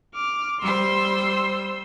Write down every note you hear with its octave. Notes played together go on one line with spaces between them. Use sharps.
D6 F6
G3 C5 C6 E6